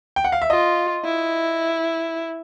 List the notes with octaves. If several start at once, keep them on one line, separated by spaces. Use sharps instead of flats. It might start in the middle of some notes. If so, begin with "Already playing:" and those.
G5
F#5
F5
E5
F4 D#5
E4